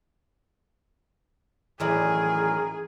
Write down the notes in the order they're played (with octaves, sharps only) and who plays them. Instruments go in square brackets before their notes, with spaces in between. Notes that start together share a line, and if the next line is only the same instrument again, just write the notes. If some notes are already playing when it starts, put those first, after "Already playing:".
[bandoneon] F#2 D#3 A#4 [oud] A2 E3 D5 [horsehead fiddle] G#4